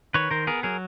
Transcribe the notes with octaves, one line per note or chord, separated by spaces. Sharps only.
D#3 B4 C#5
D#3 A#4 C5
B3 G#4 A#4
F#3 G#4 A#4